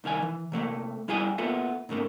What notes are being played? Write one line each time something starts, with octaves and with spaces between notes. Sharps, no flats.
C2 D#3 F5 G#5
E3
C3 F#3 A3 A#3
G3 E4 G#4 F5 G5 G#5
A#3 B3 F4 A4 E5
G#2 C#3 A3 A#3